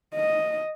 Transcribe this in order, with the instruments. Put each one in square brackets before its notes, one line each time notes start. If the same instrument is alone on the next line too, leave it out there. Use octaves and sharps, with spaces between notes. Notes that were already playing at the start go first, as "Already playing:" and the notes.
[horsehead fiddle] D#5